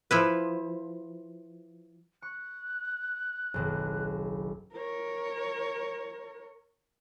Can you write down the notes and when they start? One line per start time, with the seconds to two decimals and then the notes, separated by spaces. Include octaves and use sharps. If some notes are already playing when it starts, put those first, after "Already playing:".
0.11 F3 E4 B4
2.22 C#6 F#6
3.54 F#1 B1 D#3
4.73 A#4 C#5